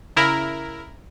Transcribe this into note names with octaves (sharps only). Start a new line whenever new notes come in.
C#3 E4 A#4